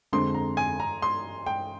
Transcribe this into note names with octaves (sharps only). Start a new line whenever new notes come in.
F2 D3 G#3 C6
A#5
G#5
A#5
C6
G5